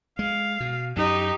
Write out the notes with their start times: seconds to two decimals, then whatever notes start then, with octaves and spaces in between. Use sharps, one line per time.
0.19 G#3 F5
0.60 B2
0.96 F#2 D#4 G4